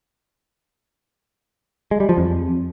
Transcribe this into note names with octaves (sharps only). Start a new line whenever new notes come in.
G#3
G3
F3
F2